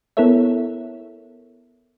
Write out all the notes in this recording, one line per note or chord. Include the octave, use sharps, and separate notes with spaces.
B3 E4 A4 A#4 C#5 E5